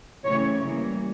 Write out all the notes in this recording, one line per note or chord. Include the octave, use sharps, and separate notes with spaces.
C#3 E3 A3 C4 C#5
E3 G3 A#3